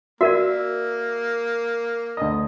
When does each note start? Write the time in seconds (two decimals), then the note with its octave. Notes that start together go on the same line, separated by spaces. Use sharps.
0.21 A#3 F#4 A#4 D5 E5
2.17 D2 D#5